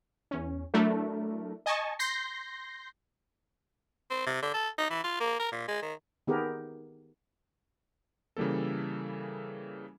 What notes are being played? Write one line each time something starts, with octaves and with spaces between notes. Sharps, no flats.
E2 C#4
F#3 A3 D4 E4 A#4
D#5 G#5 A5 C#6
C6 G6 A#6 C7
C4
C3
D3
A4
D#4
E3
F4
A#3
A#4
A#2
G#3
D#3
D#3 B3 G4 G#4 A#4
C#3 E3 G3 A#3 A4